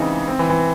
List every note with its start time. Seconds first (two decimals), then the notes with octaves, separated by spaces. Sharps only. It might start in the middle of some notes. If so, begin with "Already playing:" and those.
Already playing: C#3 E3 C4 D#4
0.28 C4
0.39 E3
0.50 E3